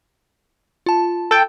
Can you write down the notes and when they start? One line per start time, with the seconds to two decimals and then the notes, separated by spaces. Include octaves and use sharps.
0.86 F4 A5
1.31 A4 G5